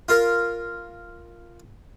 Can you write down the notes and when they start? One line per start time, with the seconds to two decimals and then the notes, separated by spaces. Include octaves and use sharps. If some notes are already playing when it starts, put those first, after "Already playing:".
0.09 F4 A#4